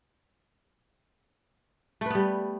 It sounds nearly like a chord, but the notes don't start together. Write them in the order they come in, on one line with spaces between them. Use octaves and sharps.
A3 B4 B3 G3